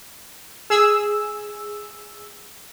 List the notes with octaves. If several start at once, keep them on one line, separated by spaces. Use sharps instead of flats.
G#4 E6